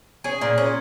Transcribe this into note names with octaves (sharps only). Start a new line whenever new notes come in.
C#4 G#4
A#2
C#4